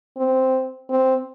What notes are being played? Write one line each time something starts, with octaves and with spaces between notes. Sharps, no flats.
C4
C4